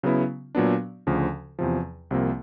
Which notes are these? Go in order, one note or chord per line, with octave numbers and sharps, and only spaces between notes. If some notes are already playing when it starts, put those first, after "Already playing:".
C#3 F#3 B3 E4
A#2 F#3 B3 D4
D2 C#3 F3
E2 C3 F3
C2 C3 F3 A#3